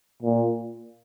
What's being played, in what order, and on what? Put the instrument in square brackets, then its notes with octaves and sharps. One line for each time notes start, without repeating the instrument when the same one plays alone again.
[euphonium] A#2